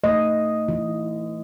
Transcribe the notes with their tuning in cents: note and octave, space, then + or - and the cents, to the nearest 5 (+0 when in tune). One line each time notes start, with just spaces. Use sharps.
A3 +30 D#5 +0
E3 +0 F4 -40